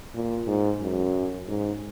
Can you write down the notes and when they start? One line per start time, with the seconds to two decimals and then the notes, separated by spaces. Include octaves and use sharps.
0.14 A#2
0.47 G#2
0.81 F#2
1.48 G#2